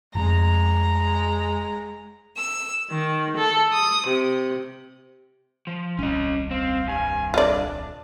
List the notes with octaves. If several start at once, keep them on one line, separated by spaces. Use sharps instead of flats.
F1 G#3 A#5
E6
D#3
A4
D#6
C3
F3
D#1 C2 C#4 D#5
C4 F5
G2 G#5
D4 F4 D5